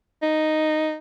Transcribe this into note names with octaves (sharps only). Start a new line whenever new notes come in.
D#4